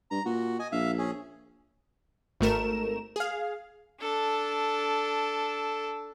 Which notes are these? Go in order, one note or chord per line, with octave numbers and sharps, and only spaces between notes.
G2 A#5
A#2 F#4
D#5 G#5
A#1 E5 F5
C#4 G#4
G#1 A3 A#4 E7
G#4 F5
D4 A4